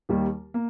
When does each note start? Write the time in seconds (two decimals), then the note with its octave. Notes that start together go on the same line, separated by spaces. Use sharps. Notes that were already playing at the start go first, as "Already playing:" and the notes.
0.09 D#2 D#3 G3 A#3
0.54 A#3